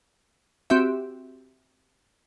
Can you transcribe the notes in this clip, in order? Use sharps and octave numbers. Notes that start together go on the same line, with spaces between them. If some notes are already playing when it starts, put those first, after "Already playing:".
C4 F#4 G4 E5